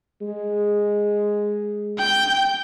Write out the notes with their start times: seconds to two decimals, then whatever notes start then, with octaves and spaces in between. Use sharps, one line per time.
0.22 G#3
1.98 G5 G6